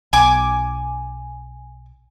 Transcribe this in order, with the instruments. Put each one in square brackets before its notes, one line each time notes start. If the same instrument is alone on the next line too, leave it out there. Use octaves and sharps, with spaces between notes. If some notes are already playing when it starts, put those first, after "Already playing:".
[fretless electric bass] B1 [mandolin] G#5 D6